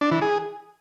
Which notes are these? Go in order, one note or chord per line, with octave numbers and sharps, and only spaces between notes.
D4
E3
G#4